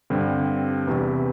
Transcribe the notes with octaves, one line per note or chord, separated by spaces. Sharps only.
G2 D3 G3 C4
E2 C3 E3